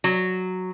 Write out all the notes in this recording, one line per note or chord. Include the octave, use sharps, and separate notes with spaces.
F#3